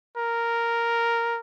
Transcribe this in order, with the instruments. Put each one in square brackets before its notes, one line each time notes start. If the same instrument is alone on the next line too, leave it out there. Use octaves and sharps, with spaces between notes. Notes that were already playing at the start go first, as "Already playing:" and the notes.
[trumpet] A#4